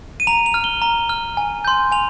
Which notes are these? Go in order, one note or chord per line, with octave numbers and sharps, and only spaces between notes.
D#7
A#5 F7
F7
F6
G7
A#5 G7
F6
G#5
C6 G6
G#5 F7